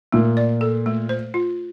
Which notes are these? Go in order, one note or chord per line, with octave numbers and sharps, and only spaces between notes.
A#2 A3
D5
A4
A3
C5
F4